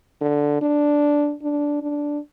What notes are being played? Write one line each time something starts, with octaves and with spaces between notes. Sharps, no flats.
D3
D4
D4
D4